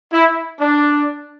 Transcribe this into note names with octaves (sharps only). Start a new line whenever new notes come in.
E4
D4